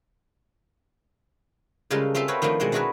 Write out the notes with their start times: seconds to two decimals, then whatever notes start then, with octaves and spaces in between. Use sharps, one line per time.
1.90 C#3 G3 G#3 F4 A4 A#4
2.14 C4 F4 A4 E5 C6
2.28 C4 F#4 A#4 B4 C#5 G5
2.42 D#3 F3 A3 A#3 D4
2.60 B2 G#3 C4 F#5
2.72 D4 E4 F#4 G#4 A#4 B4